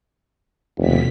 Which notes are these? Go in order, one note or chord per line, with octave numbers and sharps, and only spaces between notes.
F1 D#2 B2 B6